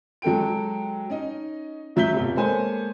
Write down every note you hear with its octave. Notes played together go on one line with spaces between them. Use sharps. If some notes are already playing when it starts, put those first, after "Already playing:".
F#3 G#3 A4 G5 D7
C#4 D#4 D#5
D2 F#3 E5 G6 B6 G7
F1 B1
G#3 A#3 A4 C5 C#5 G#5